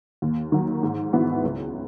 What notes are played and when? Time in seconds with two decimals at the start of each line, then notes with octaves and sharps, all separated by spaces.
0.22 D#2
0.52 D#3 F#3
0.83 G#2
1.13 E3 B3 F#4
1.44 C#2